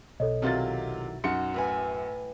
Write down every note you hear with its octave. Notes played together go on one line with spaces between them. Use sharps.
B1 A4 C#5 D#5
C3 D#3 F#3 E4 F4 A6
F#2 D#4 F#4 C6 C#7
A2 B4 G#5